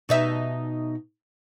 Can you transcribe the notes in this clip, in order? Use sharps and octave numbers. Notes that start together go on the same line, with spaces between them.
B2 D#4 E5